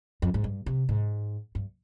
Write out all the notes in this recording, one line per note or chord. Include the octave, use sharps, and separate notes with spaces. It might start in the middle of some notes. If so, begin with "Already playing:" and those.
F2
G#2
G2
C3
G#2
G2